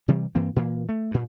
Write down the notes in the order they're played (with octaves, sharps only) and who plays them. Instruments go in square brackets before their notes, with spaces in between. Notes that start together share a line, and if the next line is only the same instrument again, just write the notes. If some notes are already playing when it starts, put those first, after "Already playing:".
[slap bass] C3 E3 G3
G2 E3 A#3 C4
A#2 E3 A#3
A3
G2 A#2